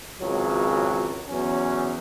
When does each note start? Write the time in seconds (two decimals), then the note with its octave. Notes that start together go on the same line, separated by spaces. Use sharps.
0.21 G#1 C#2 F#3
1.28 E2 F#3 C#4